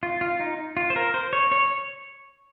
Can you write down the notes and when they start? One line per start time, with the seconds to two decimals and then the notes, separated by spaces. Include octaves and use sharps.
0.03 F4
0.21 F4
0.40 D#4
0.77 F4
0.90 C5
0.96 A#4
1.14 C5
1.33 C#5
1.52 C#5